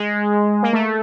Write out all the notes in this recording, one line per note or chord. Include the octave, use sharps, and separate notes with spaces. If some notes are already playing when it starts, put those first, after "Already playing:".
Already playing: G#3
A#3
A3